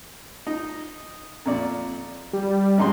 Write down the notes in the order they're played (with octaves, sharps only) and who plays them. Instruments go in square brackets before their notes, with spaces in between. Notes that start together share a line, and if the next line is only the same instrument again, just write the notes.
[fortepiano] D#4
F2 A#2 D5
[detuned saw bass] G3
[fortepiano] G#1 G#2 C6